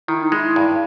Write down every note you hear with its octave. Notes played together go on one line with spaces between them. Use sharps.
D#3 E4
D#4
G#3 E4
G2